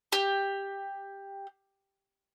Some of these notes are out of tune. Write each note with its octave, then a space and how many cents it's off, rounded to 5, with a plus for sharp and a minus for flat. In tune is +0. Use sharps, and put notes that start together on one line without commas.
G4 +10